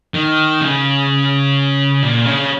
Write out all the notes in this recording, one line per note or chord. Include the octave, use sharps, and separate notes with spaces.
D#3
C#3
A#2
C#3